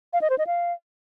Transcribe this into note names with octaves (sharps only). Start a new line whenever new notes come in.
F5
D#5
C5
D#5
F5